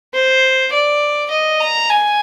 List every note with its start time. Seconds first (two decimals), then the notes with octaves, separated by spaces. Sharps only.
0.14 C5
0.73 D5
1.31 D#5
1.60 A#5
1.90 G#5